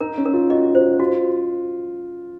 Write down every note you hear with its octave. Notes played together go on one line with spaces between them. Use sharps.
D#4 A#4
C#4
A#4
F4
F#4 D#5
F#4
F4 C5
F4 F#4